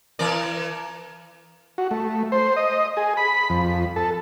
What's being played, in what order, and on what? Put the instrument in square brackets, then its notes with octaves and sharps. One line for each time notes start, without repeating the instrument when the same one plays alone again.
[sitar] E3 A#4 D5
[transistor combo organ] F#4
A3
C5
D#5
G#4
B5
F2
A4